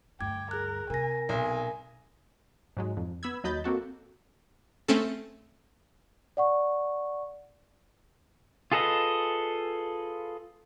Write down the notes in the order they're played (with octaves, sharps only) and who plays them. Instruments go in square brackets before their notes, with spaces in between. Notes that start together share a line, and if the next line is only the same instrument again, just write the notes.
[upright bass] D2 G2 [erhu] G5 [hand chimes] D6 G#6
[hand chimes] G#4 F#6 [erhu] A#4
[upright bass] C3 [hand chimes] A#4 A#6 [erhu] G#5
[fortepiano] B1 [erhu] G#5
[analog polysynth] G#2 F#3 G#3
F2
B3 B5 E6 G#6
D#2 F#3 D#5 B5 G6 A6
A#3 C4 F#4 A4
[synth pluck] A3 C4 C#4 A4
[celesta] D5 F#5 C#6
[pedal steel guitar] F4 G#4 A4 B4 D#5